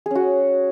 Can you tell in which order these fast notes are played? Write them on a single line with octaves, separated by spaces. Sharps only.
G#4 C#4 F#4